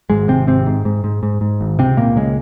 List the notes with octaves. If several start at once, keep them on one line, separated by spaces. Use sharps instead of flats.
G#1 G#2 G#3
G#1 C3 C4
G#2 C3 C4
G#2
G#2
G#2
G#2
G#2
G#1
C#2 C3 C4
C#2 A#2 A#3
C#3 G#3